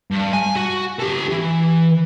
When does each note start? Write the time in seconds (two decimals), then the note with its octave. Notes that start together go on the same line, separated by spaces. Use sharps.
0.11 G2
0.33 G#5
0.56 F#4
0.99 G4 A4
1.29 E3